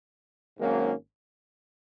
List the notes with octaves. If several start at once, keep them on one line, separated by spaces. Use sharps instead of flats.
G#1 G#2 F#3 A#3 C#4